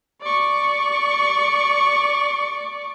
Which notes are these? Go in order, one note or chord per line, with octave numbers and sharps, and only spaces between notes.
D5 C#6